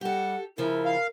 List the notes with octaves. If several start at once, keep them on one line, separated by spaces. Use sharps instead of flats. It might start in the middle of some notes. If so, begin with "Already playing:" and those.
G3 G4 A4 F#5
C#3 F3 E4 A#4
F5